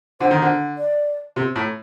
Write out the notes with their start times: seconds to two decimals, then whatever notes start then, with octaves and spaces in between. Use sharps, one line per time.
0.20 D3 C5
0.31 D#3
0.42 D3
0.78 D5
1.36 C3
1.56 A2